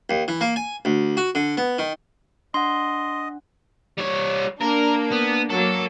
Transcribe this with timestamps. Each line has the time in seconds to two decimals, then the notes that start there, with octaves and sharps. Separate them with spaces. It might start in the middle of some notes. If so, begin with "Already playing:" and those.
0.10 D#2
0.28 E3
0.41 A#3
0.56 G#5
0.85 D2
1.17 F#4
1.35 D3
1.57 B3
1.79 D#3
2.54 D4 D#5 F#5 C6
3.98 G3 C#5
4.61 A#3 D4 A#4
5.12 B3
5.50 F#3 A#3 A4